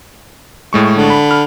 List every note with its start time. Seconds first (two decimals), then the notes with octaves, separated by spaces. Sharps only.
0.73 A2 G#3 C#6
0.96 D3
1.10 B5
1.31 B5 F6